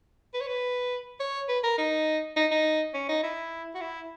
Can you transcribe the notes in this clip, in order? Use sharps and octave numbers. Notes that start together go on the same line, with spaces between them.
B4
C#5
B4
C#5
B4
A#4
D#4
D#4
D#4
C#4
D#4
E4
F#4
E4